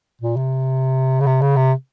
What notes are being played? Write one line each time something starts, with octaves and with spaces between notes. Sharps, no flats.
A#2
C3
C#3
C3
C#3
C3